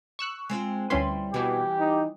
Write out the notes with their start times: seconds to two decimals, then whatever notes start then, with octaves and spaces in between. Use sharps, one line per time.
0.19 C#6 E6 F#6
0.50 G#3 C4 F4
0.90 D2 G3 C#4 E4 B4 C6
1.34 B2 E3 G4
1.79 D#4